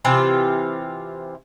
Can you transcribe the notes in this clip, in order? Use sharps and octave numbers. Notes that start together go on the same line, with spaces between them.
C3 E3 F4